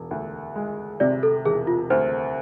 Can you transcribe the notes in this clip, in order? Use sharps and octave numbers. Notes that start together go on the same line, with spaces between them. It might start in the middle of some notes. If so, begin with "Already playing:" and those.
Already playing: E1
D2
G#3
C3 D5
A4
E1 G#4
F4
D2 C5